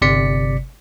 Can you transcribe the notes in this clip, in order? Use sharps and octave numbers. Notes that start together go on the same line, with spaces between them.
G1 C3 D5 B6 C#7